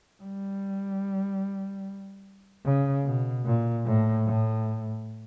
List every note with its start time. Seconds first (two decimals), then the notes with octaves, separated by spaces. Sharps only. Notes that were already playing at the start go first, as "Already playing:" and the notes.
0.23 G3
2.65 C#3
3.05 B2
3.45 A#2
3.85 A2
4.26 A2